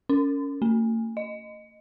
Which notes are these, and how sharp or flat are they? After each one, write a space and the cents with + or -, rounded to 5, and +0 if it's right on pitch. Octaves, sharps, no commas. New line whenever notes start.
C#4 +15
A3 +45
D#5 -5